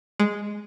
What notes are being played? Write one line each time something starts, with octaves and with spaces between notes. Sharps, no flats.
G#3